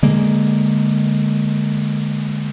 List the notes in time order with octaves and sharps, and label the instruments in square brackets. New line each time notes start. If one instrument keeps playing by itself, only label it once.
[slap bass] D3 G#3 A#3